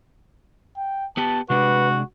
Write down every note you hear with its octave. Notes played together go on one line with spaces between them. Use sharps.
G5
B3 G4 B4 A5
C3 G#3 D4 F#4 B4